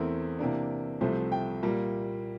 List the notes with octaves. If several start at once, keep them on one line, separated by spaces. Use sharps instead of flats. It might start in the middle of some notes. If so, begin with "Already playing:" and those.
Already playing: E2 E3 A3 C4 E4 A#4
C3 E3 A#3 D4
C2 C3 F3 A3 C5
G5
A#2 G3 A#3